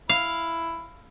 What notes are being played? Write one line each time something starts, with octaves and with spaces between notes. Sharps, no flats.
E4 F5